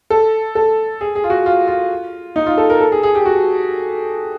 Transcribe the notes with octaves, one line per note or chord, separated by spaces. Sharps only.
A4
A4
G#4
G#4
F4
F#4
F4
F4
D#4
F4
A4
A#4
A4
G#4
G#4
G4
F#4